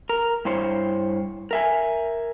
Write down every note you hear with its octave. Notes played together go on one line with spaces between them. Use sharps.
A#4
G2 E4 C5 C#5
A#4 E5 G#5